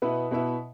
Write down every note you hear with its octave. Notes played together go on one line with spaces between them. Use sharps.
B2 B3 E4 B4 E5
B2 B3 E4 B4 E5